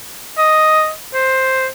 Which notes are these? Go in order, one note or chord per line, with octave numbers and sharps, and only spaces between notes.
D#5
C5